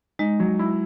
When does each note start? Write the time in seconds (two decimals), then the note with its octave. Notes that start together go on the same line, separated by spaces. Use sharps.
0.19 G#3 D#4
0.40 F#3
0.59 E4